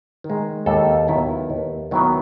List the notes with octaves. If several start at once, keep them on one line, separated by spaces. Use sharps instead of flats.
D#3
G#3
D#2 A4
D#3 F#3 B3 E4
D#2
D#3 F#3 B3 E4